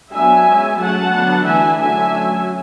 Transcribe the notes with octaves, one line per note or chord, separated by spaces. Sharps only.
F#3 B3 D4 E5 G#5
G#3 C#4
F#3 A3 C#4 F#5 A5
D3 F#3 B3 D4
E3 A3 D4 E5 G#5
D3 F#3 A3 D4 E5 G#5
F#3 A3 C#4